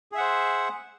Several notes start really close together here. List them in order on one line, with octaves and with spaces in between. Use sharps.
G#4 E5 F#5 C5